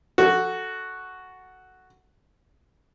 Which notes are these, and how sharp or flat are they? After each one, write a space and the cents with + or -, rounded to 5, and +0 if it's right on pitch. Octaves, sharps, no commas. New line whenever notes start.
F#4 +0 A4 +0